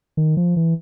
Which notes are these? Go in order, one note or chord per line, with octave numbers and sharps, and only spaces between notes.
D#3
F3
E3